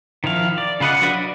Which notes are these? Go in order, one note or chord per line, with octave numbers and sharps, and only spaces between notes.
D#3 F3 E4 F5
D5
C#3 F4 B4 D#5 F#5
F#3 D4 F#4 B4
D5